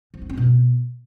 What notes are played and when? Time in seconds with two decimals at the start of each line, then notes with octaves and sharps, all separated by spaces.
0.14 F3
0.22 D#4
0.29 C#4
0.37 B2